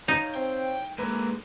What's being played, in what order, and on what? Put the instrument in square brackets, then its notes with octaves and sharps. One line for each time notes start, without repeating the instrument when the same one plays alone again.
[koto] D#4 [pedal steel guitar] C#5 F5 G6
[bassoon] C4 [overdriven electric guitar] G5
[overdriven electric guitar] D3 G#3 [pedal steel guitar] A#3 [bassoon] B4